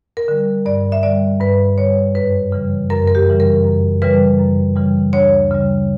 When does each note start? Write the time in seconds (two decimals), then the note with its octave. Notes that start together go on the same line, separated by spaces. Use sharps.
0.17 A#4
0.28 D3 G3
0.66 G2 D5
0.92 E5
1.03 D3 G3 D5
1.40 G2 B4
1.78 D3 G3 C#5
2.14 F#2 B4
2.52 C#3 E3 G3
2.90 F#2 A#4
3.08 A#4
3.15 G4
3.27 C#3 E3 G3
3.40 A#4
3.65 F#2
4.02 C#3 E3 G3 B4
4.39 F#2
4.76 C#3 E3 G3
5.13 D2 C#5
5.51 C#3 G3